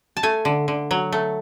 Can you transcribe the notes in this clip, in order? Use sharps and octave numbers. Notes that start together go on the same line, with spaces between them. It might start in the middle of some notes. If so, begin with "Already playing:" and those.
A5
A3 G#5
D3
D3
F#3
A3